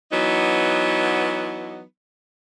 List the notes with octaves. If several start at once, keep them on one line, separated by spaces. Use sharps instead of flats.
E3 F#3 B3 D#4